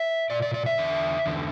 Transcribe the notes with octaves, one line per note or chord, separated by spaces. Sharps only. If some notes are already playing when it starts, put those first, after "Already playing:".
Already playing: E5
A#2 D5
D5
D5
E5
E2 D3
E2 D3